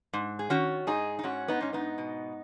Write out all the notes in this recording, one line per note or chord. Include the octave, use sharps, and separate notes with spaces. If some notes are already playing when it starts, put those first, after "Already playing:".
G#2
G#4
D#3 C#4 F#4
G#2 D#4 G#4
D#4
G#2 C#4 F#4
B3 D#4
G#2 C#4
B3 D#4
B2